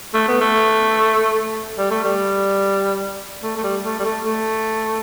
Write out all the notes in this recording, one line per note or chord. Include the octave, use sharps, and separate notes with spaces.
A3
B3
A3
G3
A3
G3
A3
A3
G3
A3
G3
A3
A3